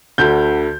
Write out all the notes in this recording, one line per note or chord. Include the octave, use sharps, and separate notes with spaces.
D2 D3 G6